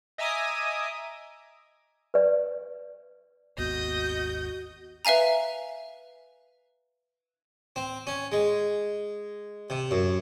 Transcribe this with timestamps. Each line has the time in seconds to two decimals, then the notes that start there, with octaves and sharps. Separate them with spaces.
0.18 D#5 E5 G#5 A#5 D6 D#6
2.14 B4 D5
3.58 G#1 D#2 B3 F#4 D#5 G6
5.05 B4 E5 F5 G#5 A#5
7.76 C4
8.07 C#4
8.32 G#3
9.70 C3
9.91 F#2